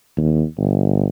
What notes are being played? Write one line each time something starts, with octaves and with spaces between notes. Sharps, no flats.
D#2
G1